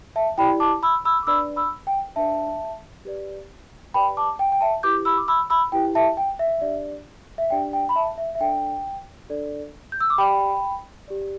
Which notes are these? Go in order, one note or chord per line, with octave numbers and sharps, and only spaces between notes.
E5 A5
E4 G4 D5 G5 B5
A5 D6
B5 E6
B5 E6
D6
D4 B4 D5 B5 E6
B5 E6
G5
D4 B4 D5 E5 A5
G4 B4 D5
G4 B4 D5 G5 B5
A5 D6
G5
G5
E5 A5
E4 G4 B4 D6 G6
B5 E6
D6
B5 E6
B5 E6
E4 G4 B4 G5
E5 A5
G5
E5
D4 G4 D5
E5
D4 G4 D5 G5
G5
B5
E5 A5
E5
E5
D4 A4 D5 G5
D4 A4 D5
G6
E6
D6
G4 D5 G5 B5
G4 D5